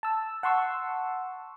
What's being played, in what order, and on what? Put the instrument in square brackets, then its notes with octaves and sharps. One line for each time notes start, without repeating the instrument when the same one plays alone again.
[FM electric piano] A5 E6
F#5 A5 C6 C#6 E6